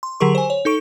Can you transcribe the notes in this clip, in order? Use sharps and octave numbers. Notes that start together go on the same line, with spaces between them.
C6
D3 F#3 G4 G#4 A#4 C#6
C5 G#5
C#5
D#4 A4 C#6 D7